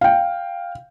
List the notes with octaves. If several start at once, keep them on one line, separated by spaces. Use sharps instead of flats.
F5 G5